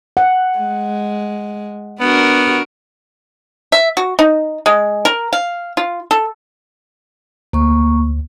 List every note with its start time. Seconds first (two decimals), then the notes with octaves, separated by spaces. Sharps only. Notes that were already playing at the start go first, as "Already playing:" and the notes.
0.17 F#5
0.59 G#3
2.00 B3 D4 F#4 A#4
3.72 E5
3.97 F#4
4.19 D#4
4.66 G#3
5.05 A#4
5.33 F5
5.77 F4
6.11 A4
7.53 D2 A#3 C#6